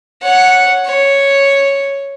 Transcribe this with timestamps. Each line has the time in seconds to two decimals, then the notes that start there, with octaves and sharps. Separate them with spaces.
0.23 C#5 F#5
0.86 C#5